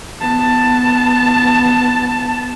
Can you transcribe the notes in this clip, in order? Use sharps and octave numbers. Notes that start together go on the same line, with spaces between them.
B3 A5